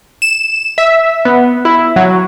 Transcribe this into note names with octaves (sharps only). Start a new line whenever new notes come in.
E7
E5
B3
E4
F#3